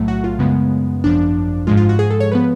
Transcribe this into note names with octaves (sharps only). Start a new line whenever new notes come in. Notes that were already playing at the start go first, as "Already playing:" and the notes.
Already playing: B1 A2 F#3 A3
F#4
F4
F#2 C#3 G#3 B3
G#1 F#2 F3 D4
G#2 F3 G#3 F4
F4
F#4
G#4
A4
C#5
F3 B3 B4